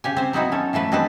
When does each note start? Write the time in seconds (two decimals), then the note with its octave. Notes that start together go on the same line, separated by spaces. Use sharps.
0.04 C#3 G4 G#5
0.17 C4 C5
0.33 F#3 B3 C4 D#4 E4 F#4
0.52 C#4 A4
0.73 E3 F3 A3 B4
0.92 G#3 C4 D4 A4 B4